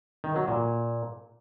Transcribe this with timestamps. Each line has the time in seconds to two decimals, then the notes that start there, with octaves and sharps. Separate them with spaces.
0.24 D#3
0.36 F#3
0.48 A#2